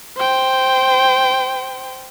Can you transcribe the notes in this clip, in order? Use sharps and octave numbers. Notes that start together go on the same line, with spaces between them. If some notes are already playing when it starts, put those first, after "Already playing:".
C5 G5